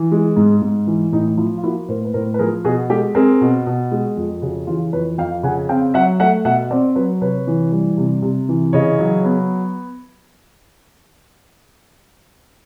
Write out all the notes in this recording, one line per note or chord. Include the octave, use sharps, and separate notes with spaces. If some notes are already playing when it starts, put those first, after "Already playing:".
Already playing: E3
G#3
G#2
G#2
E3
A2 D#4
F3 E4
F4
A#3 E4 F#4
A2 A#4 C5
B4
A2 A#4 C5
B4
F3 G#4 A#4
B2 F#4 G#4
G#3 G4 A4
C4 G#4 A#4
B2
B2
G#3
F2
C#3 F#4 G#4
E3 F4 G4
F2 B4 C#5
F2 F5 G5
C#3 F#5 G#5
C4 F5 G5
F#3 E5 F#5
A3 E5 F#5
B2 E5 F#5
C4 C5 D5
F#3 B4 C#5
C3 B4 C#5
E3
G3
C3
C3
E3
C#3 C#5 D#5
F#3
B3